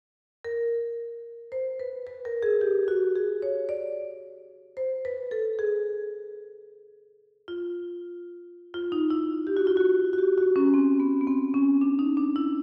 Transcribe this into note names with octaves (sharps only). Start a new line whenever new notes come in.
A#4
C5
B4
B4
A#4
G#4
G4
F#4
G#4
C#5
D5
C5
B4
A4
G#4
F4
F4
D#4
E4
G4
F#4
F4
F#4
F#4
G4
F#4
C#4
C4
B3
B3
C4
C#4
D4
D#4
D4
E4